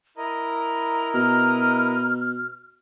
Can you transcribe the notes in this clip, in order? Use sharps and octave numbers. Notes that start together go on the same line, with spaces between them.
E4 A#4 D#5 A#5
B2 F6